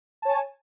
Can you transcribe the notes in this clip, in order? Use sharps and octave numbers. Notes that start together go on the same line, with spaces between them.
C#5 G#5 A5